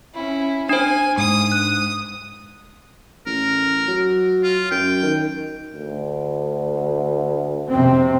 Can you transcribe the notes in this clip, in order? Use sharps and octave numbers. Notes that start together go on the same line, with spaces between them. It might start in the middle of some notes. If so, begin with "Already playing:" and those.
C#4 E4
D4 C5 G#5
G#2 D#6
F#6
A1 A#4
F#3
F4
F#2 G5
D#3
D2
F2 C3 C4